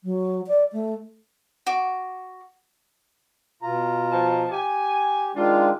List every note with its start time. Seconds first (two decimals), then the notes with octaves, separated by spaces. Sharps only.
0.04 F#3
0.47 D5
0.72 A3
1.66 F#4 D6
3.62 B2 F4 A#5
4.11 F3 D#5 A5
4.51 G4 G#5
5.35 D#3 G#3 D4 F4